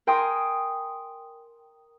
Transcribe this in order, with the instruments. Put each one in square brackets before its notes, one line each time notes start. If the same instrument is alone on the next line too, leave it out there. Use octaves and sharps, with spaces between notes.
[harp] A#4 G5 G#5 C6 D#6